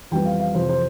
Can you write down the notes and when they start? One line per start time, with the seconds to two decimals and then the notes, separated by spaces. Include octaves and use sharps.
0.11 F2 E3 G3 B3 G5
0.25 F5
0.40 F5
0.54 F2 C3 E3 C5
0.69 C5